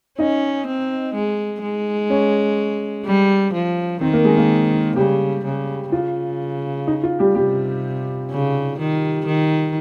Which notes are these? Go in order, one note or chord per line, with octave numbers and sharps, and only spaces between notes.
C#4 D#4 D#5
C4
G#3
G#3
C#4 C#5
G3
F3
D#3 C4 C5
A#3 A#4
G#3 G#4
A#3 A#4
C#3 G3 G4
C#3
C#3 F4
D#4
F4
G3 G4
C3 G3 G4
C#3
D#3
D#3